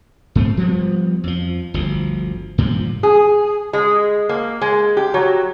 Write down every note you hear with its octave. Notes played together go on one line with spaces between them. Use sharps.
G#2 A3 C4
F3 G3 B3
F2 F3
G1 D2 F3
G2 A#2 D#3 F3
G#4
G#3
A#3
G#3
G4
F#3